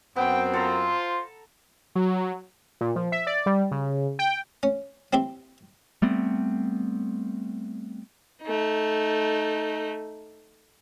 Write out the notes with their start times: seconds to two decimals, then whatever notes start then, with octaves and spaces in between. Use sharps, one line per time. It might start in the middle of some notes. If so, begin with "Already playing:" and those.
0.16 F#2 B3 C4 G5
0.54 F4 A4 C5 A#5
1.95 F#3
2.81 A#2
2.96 F3
3.12 E5
3.27 D5
3.46 G3
3.71 C#3
4.19 G5
4.63 C#4
5.13 C4 E4 G4 E5
6.02 G3 A3 B3 C4
8.43 A3 D#4